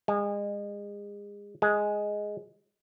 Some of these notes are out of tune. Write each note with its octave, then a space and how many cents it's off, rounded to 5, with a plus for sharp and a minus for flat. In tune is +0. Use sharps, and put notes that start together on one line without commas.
G#3 -30
G#3 +5